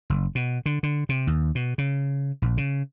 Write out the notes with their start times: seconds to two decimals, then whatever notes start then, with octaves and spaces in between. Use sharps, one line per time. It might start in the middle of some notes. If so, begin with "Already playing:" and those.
0.10 F#1
0.35 B2
0.66 D3
0.83 D3
1.09 C3
1.27 D#2
1.55 B2
1.78 C#3
2.42 A#1
2.57 C#3